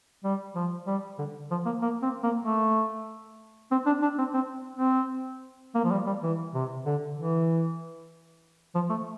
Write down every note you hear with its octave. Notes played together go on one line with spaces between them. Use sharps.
G3
F3
G3
D3
F3
A#3
A#3
C4
A#3
A3
C4
D4
D4
C4
C4
C4
A#3
F3
G3
G3
E3
C3
D3
E3
F3
A3